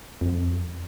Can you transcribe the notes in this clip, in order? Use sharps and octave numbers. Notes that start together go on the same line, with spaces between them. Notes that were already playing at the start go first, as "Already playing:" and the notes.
F2